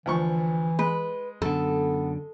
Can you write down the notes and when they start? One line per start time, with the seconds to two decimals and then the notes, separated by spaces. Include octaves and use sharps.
0.06 D2 E3 F3 C#6
0.79 G#3 B4
1.42 F#2 D3 B3 A4